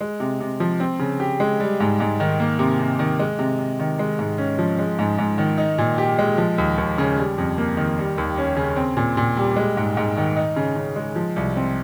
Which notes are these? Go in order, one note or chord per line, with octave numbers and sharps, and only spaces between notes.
G#3
C3
C3
F3
C4
C#3
G4
G#3
G3
G#2
G#2
D#3
A#3
C3
C3
D#3
G#3
C3
C3
D#3
G#3
G#2
C#4
F3
G#3
G#2
G#2
D#3
D#4
A#2
G4
G#3
F3
D#2
D#2
C#3
G3
F2
A#3
D#3
G3
D#2
C#4
C#3
C4
A#2
A#2
G3
G#3
G#2
G#2
D#3
D#4
C#3
C#3
G#3
F3
C2
C4